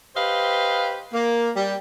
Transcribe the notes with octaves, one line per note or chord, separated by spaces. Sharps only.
G4 B4 C5 D#5 F5
A#3
G3